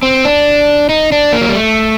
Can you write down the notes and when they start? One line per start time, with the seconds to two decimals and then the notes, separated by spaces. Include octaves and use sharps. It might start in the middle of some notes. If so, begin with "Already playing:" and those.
0.03 C4
0.25 D4
0.89 D#4
1.12 D4
1.33 A#3
1.41 F#3
1.48 G3
1.55 A3